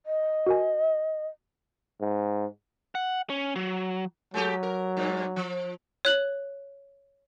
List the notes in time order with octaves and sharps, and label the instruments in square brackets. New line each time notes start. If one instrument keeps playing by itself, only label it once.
[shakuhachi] D#5
[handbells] F#4 A#4 G#5
[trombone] G#2
[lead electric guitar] F#5
C#4
F#3
[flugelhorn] F#3 [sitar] G#3 A3 G4
[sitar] A#4
G2 A#2
F3
[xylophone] C#5 F#6 F#7